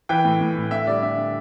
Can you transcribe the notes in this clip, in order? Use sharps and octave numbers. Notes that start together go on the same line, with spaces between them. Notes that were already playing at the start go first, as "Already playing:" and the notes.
E3 G5
A2
A2
A2
D3 E5
G3 D5
D3 E5
D3